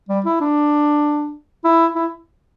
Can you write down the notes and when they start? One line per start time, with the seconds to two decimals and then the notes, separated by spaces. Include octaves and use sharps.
0.09 G3
0.25 E4
0.41 D4
1.64 E4
1.95 E4